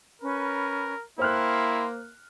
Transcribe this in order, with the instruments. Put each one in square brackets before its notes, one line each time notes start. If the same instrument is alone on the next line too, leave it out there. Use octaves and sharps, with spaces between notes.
[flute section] C#4 B4 B5 [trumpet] A#4
[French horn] A#3 [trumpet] E4 [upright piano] C5 F6 F#6 [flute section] G5 C6